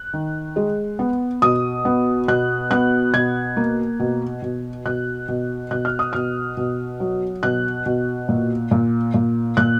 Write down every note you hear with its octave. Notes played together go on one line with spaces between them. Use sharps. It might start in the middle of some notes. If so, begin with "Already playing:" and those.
Already playing: F#6
D#3
G#3
B3
B2 D#6
B3
B2 F#6
B3 F#6
B2 G#6
A#3
B2
B2
B2 F#6
B2
B2 F#6
F6
D#6
B2 F6
B2
F#3
B2 F#6
B2
A#2
A#2
A#2
A#2 F#6